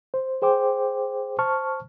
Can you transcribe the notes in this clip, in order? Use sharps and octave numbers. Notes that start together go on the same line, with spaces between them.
C5
G#4 C5 G5 D6
C5 A5 C#6 F6